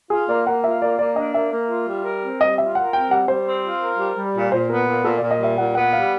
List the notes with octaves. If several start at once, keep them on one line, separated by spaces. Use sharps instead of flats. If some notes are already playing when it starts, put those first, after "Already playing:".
F4 G#4
A#3 D5
A#3 F#5
F4 E5
A#3 D5
A#3 D5
D4 D#5
A#3 E5
A#3
F4
G3
A#4
C4
G3 D#5
F4 E5
A#4 F#5
C4 G5
G3 F#5
G3 C5
C4
F4
A#4
G3
G3
A#2
A#2 C5
B3 A#4
A#2
A#2 A4
D5
A#2
D#5
G3 E5
A#2 F#5
B3 F#5
G3 F5